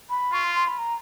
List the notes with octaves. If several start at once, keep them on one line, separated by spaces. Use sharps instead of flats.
B5
F4 C#6
C6
C6
B5
A#5